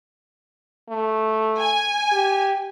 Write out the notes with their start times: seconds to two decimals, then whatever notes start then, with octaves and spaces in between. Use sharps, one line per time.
0.89 A3
1.60 G#5
2.12 G4